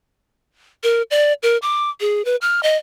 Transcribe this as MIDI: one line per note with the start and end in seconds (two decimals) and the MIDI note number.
0.83 1.02 70
1.11 1.33 74
1.43 1.58 70
1.62 1.90 86
2.00 2.24 68
2.25 2.36 71
2.41 2.63 89
2.63 2.77 75